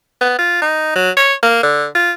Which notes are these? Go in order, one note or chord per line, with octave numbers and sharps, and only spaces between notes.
B3
F4
D#4
F#3
C#5
A#3
D3
F4